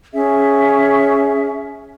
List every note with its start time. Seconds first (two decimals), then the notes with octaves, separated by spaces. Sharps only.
0.13 C#4 G#4 E5